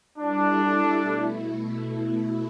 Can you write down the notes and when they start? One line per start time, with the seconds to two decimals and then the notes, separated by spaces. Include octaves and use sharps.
0.18 G3 D4 E4 A4
1.01 B2 A3 E4